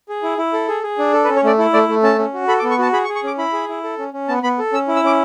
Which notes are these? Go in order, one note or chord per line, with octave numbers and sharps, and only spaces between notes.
G#4
E4
E4
A4
G#4
G#4
D4
A4
B4
C#4
C#5
A3 D5
E4 A4
A3 D5
A3
C#4 A5
C#4
F#4
A4 B5
D6
B3
C#6
F#4 A5
G#4 B5
C#6
G#4
C#6
C#4 D6
E4 B5
G#4
E4
A4
C#4
C#4
B3 A5
B3 B5
A4
C#4 E6
E4
E6
C#4 D6